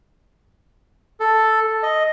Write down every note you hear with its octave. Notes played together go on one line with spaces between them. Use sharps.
A4
D#5